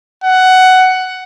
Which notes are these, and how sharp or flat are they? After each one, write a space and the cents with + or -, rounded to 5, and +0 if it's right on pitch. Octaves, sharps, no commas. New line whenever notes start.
F#5 +10